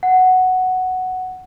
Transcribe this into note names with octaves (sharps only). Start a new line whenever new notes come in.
F#5